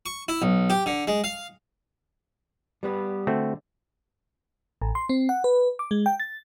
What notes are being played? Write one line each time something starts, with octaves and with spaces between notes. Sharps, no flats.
C#6
E4
B1
G4
D3
G#3
F5
G3 B3 B4
D3 A3 C4 F#4
A1
C6
C4
F#5
B4
D6
G#3
G5
A6